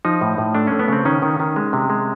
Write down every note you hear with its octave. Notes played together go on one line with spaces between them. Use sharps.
F3 D#4
A2
A2
A3 D4
A3 C#4
B3
C#3 C4
D#3 C#4
D#3
D#3
G#3
C3
G#3